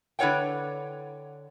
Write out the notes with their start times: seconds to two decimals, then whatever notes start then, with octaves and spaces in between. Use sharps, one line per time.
0.19 D3 E4 B4 C#5 F#5 G5